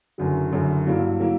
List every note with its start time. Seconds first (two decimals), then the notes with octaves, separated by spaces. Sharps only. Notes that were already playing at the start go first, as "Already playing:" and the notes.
0.18 F#1 F#2 D3 F#3
0.52 F#1 F#2 D3 F#3
0.87 G2 F#3 A#3 E4
1.20 F#3 A#3 E4